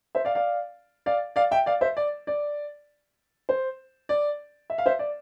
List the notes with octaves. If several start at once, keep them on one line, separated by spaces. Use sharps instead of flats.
C5 E5
D5 F5
D5 F5
D5 F5
D5 F5
E5 G5
D5 F5
C5 E5
D5
D5
C5
D5
E5
F5
C5 E5
D5